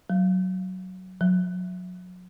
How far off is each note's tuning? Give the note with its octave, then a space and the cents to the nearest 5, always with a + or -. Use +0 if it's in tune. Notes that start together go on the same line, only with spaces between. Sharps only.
F#3 +5
F#3 -30